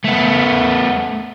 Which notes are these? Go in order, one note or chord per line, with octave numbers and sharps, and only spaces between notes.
A3 B3